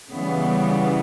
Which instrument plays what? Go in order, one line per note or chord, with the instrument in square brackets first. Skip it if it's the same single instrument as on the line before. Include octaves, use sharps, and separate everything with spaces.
[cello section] C#3 E3 G3 B3